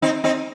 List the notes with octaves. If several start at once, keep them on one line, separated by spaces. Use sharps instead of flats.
C4 D#4
C4 D#4